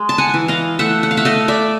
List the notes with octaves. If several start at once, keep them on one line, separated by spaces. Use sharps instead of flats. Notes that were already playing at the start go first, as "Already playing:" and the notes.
Already playing: G#3
A5
F#5 G#5
E3
D#5 F5
A3 E5 F#5
F#5
F5
E5 F#5
A3 D#5 F5
D5 E5